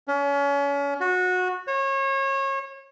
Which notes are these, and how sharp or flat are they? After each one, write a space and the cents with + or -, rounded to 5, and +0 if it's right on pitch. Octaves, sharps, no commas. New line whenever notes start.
C#4 +35
F#4 -20
C#5 -30